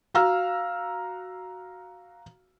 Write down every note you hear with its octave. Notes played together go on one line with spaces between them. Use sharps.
F#4 F5 A#5 E6 F6